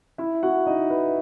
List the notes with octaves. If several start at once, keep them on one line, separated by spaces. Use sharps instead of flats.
E4 E5
F#4 F#5
D#4 D#5
B4